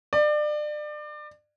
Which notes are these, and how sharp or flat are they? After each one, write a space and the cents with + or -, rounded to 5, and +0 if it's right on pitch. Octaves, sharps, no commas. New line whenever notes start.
D5 +30